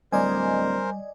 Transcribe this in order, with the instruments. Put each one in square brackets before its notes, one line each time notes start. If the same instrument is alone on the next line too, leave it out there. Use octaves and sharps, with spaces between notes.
[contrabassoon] D1 [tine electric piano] G3 [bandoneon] A#4 C5 [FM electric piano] D5 D#5 G#5